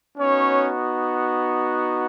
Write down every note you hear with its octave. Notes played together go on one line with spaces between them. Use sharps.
B3 C#4 D#4 F#4 C#5